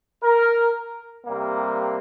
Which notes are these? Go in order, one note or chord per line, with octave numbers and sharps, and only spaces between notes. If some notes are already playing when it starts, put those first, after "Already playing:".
A#4
C3 G3 A#3